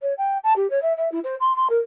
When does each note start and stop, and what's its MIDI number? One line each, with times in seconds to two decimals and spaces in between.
0.01 0.13 73
0.17 0.38 79
0.43 0.53 81
0.56 0.69 67
0.70 0.81 73
0.82 0.93 76
0.97 1.10 76
1.11 1.19 64
1.24 1.35 72
1.40 1.55 84
1.56 1.67 84
1.69 1.79 70